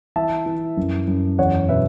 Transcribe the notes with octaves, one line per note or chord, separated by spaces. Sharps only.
E3 E5 A5
E3
F#2
F#2
E2 C#5 F#5
B2 B4 E5